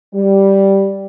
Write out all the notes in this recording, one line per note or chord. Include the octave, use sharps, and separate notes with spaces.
G3